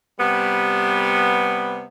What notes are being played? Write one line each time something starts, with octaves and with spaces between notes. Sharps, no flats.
C3 G3 B3